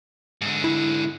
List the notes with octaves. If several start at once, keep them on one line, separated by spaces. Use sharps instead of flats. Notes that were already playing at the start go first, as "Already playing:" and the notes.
G#2 D3
E4